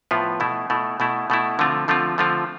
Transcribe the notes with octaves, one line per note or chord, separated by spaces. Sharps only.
A2 F3 B3 F4
B2 A3 E4
B2 A3 E4
B2 A3 E4
B2 A3 E4
D3 F3 A3 C4 F4
D3 F3 A3 C4 F4
D3 F3 A3 C4 F4